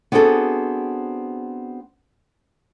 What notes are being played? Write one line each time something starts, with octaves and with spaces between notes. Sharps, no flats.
B3 C4 D4 F#4 G#4 A4